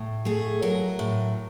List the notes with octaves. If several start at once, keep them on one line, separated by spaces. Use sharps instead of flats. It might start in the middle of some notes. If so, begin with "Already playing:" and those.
Already playing: A2
A3 G#4
F#3 A#4
A2